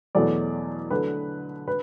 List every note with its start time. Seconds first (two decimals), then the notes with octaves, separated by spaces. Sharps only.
0.15 E2 B2 F#3 A3 D5
0.91 D3 F#3 A3 B4
1.67 D3 B4